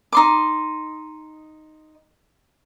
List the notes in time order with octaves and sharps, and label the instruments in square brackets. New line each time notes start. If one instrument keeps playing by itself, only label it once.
[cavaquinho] D#4 C6 D6